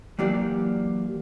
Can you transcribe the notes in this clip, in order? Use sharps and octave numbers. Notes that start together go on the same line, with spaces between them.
E3 F#3 A#3 G4 D5